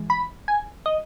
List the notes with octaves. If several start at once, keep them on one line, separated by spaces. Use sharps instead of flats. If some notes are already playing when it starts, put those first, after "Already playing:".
Already playing: E3 G#3
B5
G#5
D#5